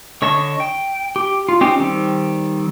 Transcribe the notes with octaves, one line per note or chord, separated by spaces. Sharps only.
D3 C#5 D#5 A5 C#6
G5
G4
F4
C4 C#4 D#4 G4
D#3 G3 C4